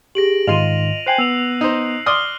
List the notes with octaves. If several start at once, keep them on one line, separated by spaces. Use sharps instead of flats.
G4 G#4 A#6 D7 F#7
G#2 D#3 F4 D#5 C6 D#7 F7
C5 G5 G#5 F#6 C7 F#7
B3 E6 F7
D#4 C5
D5 C6 D#6 F6 G7